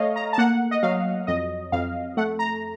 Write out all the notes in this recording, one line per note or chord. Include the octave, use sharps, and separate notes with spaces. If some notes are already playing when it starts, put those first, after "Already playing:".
Already playing: A3 C#5 D#5 F5
A#5
A5
A#3 F#5
D#5
F#3 F5
F2 D#5
F2 F5
A3 F#5
A#5